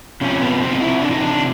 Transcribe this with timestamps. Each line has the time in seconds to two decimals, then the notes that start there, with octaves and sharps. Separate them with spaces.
0.21 C3 F3 C#4
0.41 B3
0.61 C4
0.72 D#4
0.81 E4
1.01 D4
1.11 D#4
1.21 D4